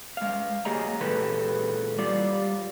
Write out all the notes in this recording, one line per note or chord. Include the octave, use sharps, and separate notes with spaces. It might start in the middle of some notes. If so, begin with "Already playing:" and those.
G#3 F5
F#3 A#3 G4 G#4 D#5 A#5
A#2 E3 G#3 G4 A4 B4
G3 F4 D5